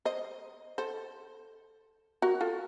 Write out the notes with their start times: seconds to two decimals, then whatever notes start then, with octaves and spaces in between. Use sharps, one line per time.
0.05 C5 D#5
0.78 A4 C5
2.22 F#4 A#4
2.41 F4 A4